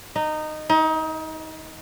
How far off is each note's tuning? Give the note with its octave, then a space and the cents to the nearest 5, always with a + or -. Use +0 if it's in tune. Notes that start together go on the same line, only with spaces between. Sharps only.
D#4 -15
D#4 +30